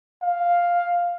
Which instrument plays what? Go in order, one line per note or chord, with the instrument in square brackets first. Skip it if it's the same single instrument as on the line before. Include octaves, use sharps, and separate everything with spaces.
[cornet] F5